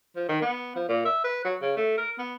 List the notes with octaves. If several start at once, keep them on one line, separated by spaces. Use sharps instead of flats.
F3
D#3
B3
F3
A#2
E5
B4
F#3
C#3
A3
A#4
B3